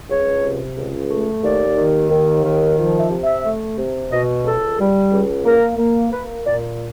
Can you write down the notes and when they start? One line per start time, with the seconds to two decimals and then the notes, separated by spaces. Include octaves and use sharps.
0.09 C#2 C#5
0.43 C3
0.77 C#2
1.10 A3
1.43 D#2 D5
1.77 D#3
2.10 D#2
2.44 D#3
2.78 F3
2.99 E5
3.10 C3
3.22 E5
3.44 A3
3.77 C3
4.10 B2 D#5
4.44 C#2 A4
4.78 G3
5.11 C#2
5.44 A#3 A#4
5.78 A#3
6.11 A#3 B4
6.45 A#2 D5